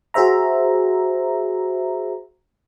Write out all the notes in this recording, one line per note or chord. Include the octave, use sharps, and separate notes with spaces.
F#4 G#4 C5 E5 A#5